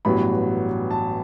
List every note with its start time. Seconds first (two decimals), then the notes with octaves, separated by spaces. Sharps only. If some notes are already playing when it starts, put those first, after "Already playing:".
0.05 A1 G2 F#3 B3 B5
0.91 A5